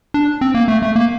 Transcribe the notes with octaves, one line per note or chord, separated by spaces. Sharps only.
D4
C4
A#3
A3
A3
A#3